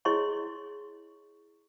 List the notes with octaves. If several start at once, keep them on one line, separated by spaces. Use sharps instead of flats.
E4 G#4 C#5 D#5 C6 C#6